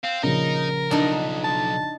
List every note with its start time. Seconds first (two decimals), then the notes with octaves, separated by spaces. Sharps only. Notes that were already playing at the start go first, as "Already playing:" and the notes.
0.04 C4 F5
0.23 A#1 C#3 D#4 A#4
0.91 B1 D4 D#4
1.44 A5